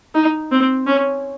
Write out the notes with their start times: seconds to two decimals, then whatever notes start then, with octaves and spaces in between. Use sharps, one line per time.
0.14 D#4
0.52 C4
0.87 C#4